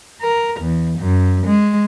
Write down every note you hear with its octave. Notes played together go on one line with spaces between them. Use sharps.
A#4
E2
F#2
G#3